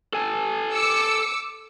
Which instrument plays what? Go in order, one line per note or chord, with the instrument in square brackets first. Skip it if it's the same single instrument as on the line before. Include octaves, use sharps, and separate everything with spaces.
[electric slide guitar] A4 G#5 A5
[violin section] D6 E6 C#7